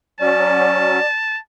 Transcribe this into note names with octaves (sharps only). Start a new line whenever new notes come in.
F#3 C#4 D5 A5